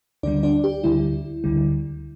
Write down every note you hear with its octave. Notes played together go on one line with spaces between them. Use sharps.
D2 D3 G3 D4 D5
D4 D5
G4
D2 D3 G3 E4
D2 D3 G3